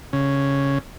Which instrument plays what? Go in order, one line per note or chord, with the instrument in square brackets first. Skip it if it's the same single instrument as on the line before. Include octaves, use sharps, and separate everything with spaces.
[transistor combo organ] C#3